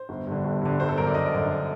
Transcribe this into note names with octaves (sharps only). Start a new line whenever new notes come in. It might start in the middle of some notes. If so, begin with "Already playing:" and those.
Already playing: C5
G1
G2 D3
G1
G2 D3
G1 C5
A4
F#2 D3 A#4
D5
G1 D#5
F#2 D3